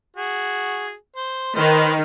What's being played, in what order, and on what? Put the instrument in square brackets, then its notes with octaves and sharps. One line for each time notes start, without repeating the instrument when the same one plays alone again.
[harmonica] F#4 G#4
C5
[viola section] D#3 [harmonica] B4 C5